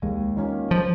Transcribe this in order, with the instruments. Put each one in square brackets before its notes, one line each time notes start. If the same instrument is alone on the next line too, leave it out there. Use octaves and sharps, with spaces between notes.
[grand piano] D#2 [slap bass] G#3
[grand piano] D#3 A#3 C#4 F4
[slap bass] F3